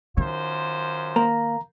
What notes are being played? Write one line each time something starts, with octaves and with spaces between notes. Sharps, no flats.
F#2 D#3 F4 C5
A#3 A#5